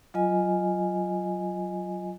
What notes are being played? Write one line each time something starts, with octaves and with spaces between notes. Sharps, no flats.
F#3 F4 D#5 G#5